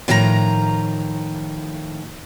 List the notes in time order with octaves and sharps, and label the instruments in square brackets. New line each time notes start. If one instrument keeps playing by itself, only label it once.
[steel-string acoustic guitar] A2 D#3 F3 G#4 A#5